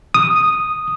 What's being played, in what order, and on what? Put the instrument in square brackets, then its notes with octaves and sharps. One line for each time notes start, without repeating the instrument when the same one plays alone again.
[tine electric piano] D#6